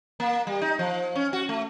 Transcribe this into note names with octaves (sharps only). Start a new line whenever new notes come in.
A#3
G3
D#4
F3
C#4
F#4
A3